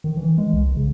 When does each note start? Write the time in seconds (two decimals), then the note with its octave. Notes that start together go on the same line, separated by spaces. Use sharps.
0.04 D#3
0.17 E3
0.38 G#3
0.53 C2
0.77 C#3